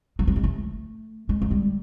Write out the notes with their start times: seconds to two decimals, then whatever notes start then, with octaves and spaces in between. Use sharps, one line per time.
0.19 F#3
0.27 G3
0.36 G#3
0.44 A3
1.29 G#3
1.42 F#3
1.51 G3